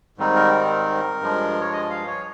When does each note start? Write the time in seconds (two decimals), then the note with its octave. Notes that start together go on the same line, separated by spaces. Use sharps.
0.18 G#2 D#3 G3 C4 D#4
0.36 A#4
0.52 A#4
1.21 G2 F3 G#3
1.61 C#5
1.72 D#5
1.90 F5
2.07 C#5